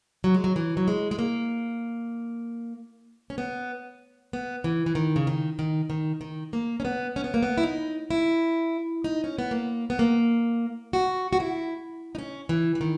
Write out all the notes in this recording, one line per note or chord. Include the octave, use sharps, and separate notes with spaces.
F#3
G#3
F#3
E3
F#3
G#3
G#3
A#3
C#4
B3
B3
E3
E3
D#3
C#3
D#3
D#3
D#3
D#3
A#3
C#4
B3
C#4
B3
A#3
B3
E4
D#4
E4
D#4
C#4
B3
A#3
B3
A#3
F#4
F#4
E4
D#4
C#4
E3
E3
D#3